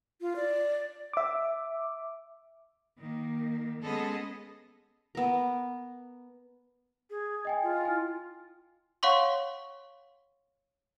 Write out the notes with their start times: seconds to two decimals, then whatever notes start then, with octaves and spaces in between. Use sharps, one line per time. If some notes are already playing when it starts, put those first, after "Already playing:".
0.21 F4
0.36 D5
1.13 E5 D6
2.98 D#3 A#3
3.81 G#3 B3 C#4 G#4 A4 D#5
5.15 B3 A#4
7.10 G#4
7.45 D#5 G5 G#5
7.63 F4
7.85 E4 G#5
9.03 C#5 F5 F#5 C6 C#6